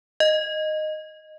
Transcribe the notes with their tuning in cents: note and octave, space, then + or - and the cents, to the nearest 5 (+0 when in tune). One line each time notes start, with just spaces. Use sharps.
D#5 -10